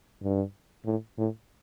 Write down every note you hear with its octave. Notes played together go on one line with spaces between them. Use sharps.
G2
A2
A2